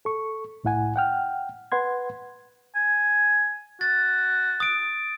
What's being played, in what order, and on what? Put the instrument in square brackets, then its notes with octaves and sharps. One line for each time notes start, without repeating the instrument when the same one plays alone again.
[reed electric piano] A4 C#6
C2 A2 E4 F#5 G#5
F#5 G5 F6
B4 F#5 C6 G#6
[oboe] G#5
[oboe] F#4 [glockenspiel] A6
[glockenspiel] D#6 D7